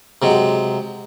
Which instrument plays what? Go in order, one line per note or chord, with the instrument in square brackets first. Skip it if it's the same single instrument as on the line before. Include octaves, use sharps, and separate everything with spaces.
[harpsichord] C3 F#3 G#3